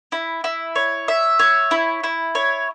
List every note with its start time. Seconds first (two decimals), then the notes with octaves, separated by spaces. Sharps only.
0.12 E4
0.44 E4
0.75 C#5
1.08 E5
1.39 C#5
1.71 E4
2.03 E4
2.35 C#5